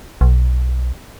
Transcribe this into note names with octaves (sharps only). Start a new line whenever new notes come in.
B1